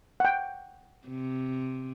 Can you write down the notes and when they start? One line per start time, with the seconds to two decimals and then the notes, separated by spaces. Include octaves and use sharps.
0.20 F#5 G5
1.07 C3